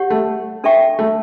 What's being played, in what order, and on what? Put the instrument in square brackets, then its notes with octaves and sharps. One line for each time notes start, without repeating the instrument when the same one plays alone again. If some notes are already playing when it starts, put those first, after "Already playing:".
Already playing: [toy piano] G4 C#5 F#5 C#6
[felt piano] A3
[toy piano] D4 A4 E5 G5 C#6
[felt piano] A3